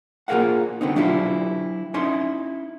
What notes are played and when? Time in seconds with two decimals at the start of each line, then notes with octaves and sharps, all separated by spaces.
0.28 A#3 F4 G#4 A#4 F5 F#5
0.81 D3 B3 C4 D#4
0.96 F#3 D4 E4 F4 G4
1.94 C#4 D#4 E4 D#5 C6